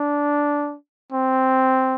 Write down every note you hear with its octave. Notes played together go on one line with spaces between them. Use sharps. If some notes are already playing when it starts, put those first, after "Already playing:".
Already playing: D4
C4